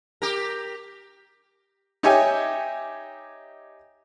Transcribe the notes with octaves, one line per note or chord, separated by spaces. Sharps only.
G4 A#4
D#4 G4 C#5 D#5 E5 G#5